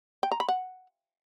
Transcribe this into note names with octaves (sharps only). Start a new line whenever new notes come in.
G5
A#5
B5
F#5